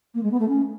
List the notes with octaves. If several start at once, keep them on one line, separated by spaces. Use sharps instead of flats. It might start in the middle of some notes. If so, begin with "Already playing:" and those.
A#3
G#3
B3
A3
C#4